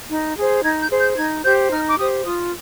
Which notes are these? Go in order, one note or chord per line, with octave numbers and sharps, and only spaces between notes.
D#4
G#4 C5
D#4 G#6
G6
G#4 C5
G6
D#4 G#6
G4 C5 G6
D#4 F6
D6
G4 C5 D#6
F4 D#6